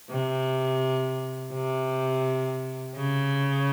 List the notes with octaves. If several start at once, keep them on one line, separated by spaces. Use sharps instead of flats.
C3
C3
C#3